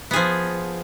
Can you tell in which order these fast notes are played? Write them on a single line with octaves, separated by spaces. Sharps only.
B3 G#4 F3